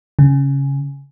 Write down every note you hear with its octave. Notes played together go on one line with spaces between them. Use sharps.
C#3